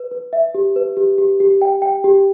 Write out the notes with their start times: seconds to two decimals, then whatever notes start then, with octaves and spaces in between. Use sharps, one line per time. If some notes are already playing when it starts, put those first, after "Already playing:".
Already playing: B4
0.11 B4
0.33 E5
0.55 G4
0.76 B4
0.97 G4
1.18 G4
1.40 G4
1.62 G5
1.82 G5
2.04 G4